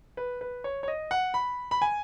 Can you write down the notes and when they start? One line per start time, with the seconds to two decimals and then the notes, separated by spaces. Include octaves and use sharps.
0.17 B4
0.41 B4
0.64 C#5
0.83 C#5
0.88 D#5
1.11 F#5
1.34 B5
1.71 B5
1.82 G#5